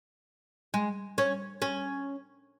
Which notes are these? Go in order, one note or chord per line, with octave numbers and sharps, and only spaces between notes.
G#3
C#4
C#4